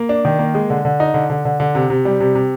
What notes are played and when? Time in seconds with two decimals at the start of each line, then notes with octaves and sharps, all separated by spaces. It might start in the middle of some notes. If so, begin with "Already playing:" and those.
Already playing: A#3
0.09 D4
0.25 D#3
0.39 A#3
0.54 G#3
0.70 D3
0.85 D3
1.00 D#4
1.14 D3
1.30 D3
1.45 D3
1.60 D3
1.75 C3
1.90 C3
2.05 G3
2.20 C3
2.35 C3